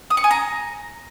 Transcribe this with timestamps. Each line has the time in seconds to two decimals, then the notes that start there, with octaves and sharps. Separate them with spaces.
0.10 D#6
0.17 C#6
0.24 G#5
0.31 A#5